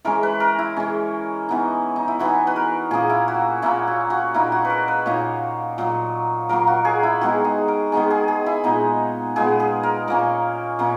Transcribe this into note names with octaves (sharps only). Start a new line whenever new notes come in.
E3 G#3 C#4 A#4
B4
A#4
E4
E3 G#3 C#4
E3 B3 D#4
D#4
E4
E3 B3 D#4 F#4
B4
A#4
A#2 A#3 C#4 G#4
E4
F#4
A#2 A#3 C#4 E4
F#4
F#4
A#2 A#3 D#4 E4
F#4
B4
A#4
B4
A#2 A#3 D#4 C#5
A#2 F#3 A#3
A#2 F#3 A#3 A#4
F#4
G#4
E4
D#3 G#3 B3 D#4 F#4
G#4
A#4
D#3 G#3 B3 D#4 G#4
G#4
G#4
E4
A#2 G#3 B3 D#4
A#2 G#3 B3 G#4
G#4
A#4
A#2 A#3 C#4 A#4
A#2 A#3 C#4